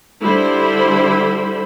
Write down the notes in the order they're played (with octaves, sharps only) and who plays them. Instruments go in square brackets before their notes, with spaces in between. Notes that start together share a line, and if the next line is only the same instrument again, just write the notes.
[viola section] D3 G3 E4 C5 B5